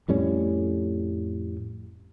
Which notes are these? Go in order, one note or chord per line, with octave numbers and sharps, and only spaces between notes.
F2 A2 G3 C#4